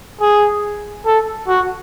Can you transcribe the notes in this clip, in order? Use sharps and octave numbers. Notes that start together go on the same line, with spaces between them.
G#4
A4
F#4